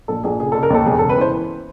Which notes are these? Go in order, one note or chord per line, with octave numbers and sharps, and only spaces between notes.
A#1 A4
A#1 G#4
C#3 G#4
C#3 A4
A#4
D#2 A4
E1 G#4
A4
C#3
B4
E3 C5